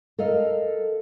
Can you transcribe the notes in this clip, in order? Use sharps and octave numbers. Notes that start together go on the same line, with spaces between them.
A4 A#4 D#5 F5